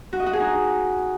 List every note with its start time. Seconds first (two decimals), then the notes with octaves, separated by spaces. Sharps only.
0.13 F#4
0.20 D#5
0.26 F#4
0.33 G#4
0.40 D#4